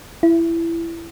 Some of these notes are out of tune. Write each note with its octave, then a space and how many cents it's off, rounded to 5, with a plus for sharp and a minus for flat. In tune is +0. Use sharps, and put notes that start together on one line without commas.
E4 +15